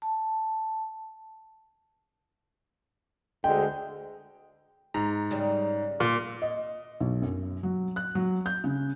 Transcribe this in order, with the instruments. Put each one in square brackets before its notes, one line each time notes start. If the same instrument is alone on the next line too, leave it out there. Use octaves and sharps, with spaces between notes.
[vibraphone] A5
[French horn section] D2 D3 G#3 [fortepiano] G5
[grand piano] G#2 [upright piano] A#5
[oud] C#3 G3
[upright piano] A#2
[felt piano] D#5
B1
F#2
F#3
F#6
F#3
G6
C#3